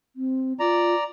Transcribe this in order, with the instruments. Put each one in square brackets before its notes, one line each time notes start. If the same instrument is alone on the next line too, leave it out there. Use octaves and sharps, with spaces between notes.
[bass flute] C4
[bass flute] F4 [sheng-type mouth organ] D5 A#5